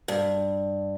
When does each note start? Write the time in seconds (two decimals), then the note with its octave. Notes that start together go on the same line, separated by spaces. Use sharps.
0.08 G2